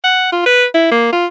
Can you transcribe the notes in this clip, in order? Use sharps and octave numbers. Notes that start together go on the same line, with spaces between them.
F#5
F4
B4
E4
A#3
F4